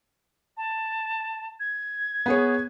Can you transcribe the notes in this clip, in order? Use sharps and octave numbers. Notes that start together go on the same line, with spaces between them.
A5
G#6
B3 G#4 C#5